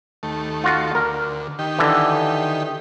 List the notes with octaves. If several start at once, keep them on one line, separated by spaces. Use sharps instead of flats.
D#2 A3
F4 F#4
D2 A#4
D#3 G4
D3 E3